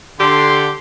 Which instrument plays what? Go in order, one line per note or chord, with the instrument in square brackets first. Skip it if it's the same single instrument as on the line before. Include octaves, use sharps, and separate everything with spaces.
[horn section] D3 [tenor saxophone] G4 [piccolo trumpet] C6